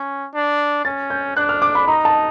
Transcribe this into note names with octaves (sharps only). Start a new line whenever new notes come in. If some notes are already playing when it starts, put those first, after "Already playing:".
Already playing: C#4
D4
C#4 A6
G6
D4 F#6
F6
D6
B5
D#4 A#5
A5